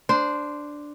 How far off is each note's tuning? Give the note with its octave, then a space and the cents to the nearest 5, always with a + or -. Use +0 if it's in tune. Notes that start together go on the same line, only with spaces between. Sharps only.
D4 +0 C5 -10